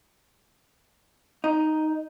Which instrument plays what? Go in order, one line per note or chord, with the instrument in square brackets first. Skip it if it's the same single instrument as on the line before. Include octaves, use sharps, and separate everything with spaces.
[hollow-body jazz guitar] D#4